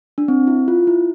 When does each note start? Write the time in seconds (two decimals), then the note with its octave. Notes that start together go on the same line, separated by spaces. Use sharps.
0.18 D4
0.28 C4
0.47 E4
0.68 F4
0.87 E4